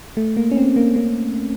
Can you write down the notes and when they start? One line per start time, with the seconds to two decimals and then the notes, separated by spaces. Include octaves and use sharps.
0.17 A3
0.37 A#3
0.51 C#4
0.57 C4
0.76 A#3
0.96 A#3